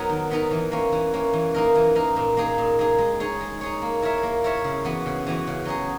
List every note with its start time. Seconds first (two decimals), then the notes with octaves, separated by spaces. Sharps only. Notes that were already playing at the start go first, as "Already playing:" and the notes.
Already playing: F#3 B3 D#4 A#4
0.09 D#3
0.30 F#3 B3 D#4 A#4
0.51 E3
0.72 A#3 C#4
0.92 E3
1.13 A#3 C#4
1.33 E3
1.55 A#3 D#4 A#4
1.75 E3
1.95 A#3 D#4 A#4
2.16 A#2
2.37 A#3 D#4 G#4
2.58 A#2
2.79 A#3 D#4 G#4
2.99 G#3
3.20 D#4 G#4 C#5
3.41 G#3
3.61 D#4 G#4 C#5
3.82 A#3
4.02 E4 A#4 C#5 E5
4.23 A#3
4.44 E4 A#4 C#5 E5
4.64 C#3
4.85 E3 B3 F#4
5.06 C#3
5.27 E3 B3 F#4
5.47 C#3
5.65 F#3 C#4 G#4 D#5